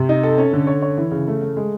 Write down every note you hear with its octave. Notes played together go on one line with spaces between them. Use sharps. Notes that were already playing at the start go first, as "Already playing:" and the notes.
Already playing: C3
D#4
A4
C#4
D3
C#5
C#5
E3
C#3
A3
A3
G#3